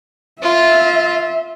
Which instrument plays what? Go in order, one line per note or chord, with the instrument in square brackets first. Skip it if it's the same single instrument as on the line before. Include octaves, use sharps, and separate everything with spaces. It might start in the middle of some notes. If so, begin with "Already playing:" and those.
[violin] F4 [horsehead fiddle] E5